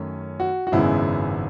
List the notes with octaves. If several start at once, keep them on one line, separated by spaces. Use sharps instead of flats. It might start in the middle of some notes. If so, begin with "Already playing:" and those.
Already playing: F#2 D#3 A3 C#4
F#4
F#4
G#1 F#2 C#3 G#3 B3 E4